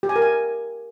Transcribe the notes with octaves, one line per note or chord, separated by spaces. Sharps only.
G4
G#5
A#4
G#5